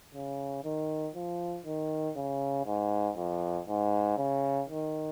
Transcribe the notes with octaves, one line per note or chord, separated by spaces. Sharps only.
C#3
D#3
F3
D#3
C#3
G#2
F2
G#2
C#3
D#3